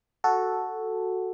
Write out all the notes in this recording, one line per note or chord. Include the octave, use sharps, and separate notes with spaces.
F#4 A4